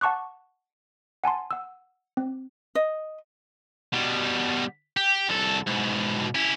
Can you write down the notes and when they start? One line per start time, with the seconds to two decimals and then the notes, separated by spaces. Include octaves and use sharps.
0.01 F#5 A5 C#6 D6 F#6
1.24 F#5 G#5 A5 C6
1.51 F#5 E6
2.17 C4
2.75 D#5
3.93 B2 G3
4.97 G4
5.29 C2 A4
5.67 G#2 B2
6.35 C#4 E4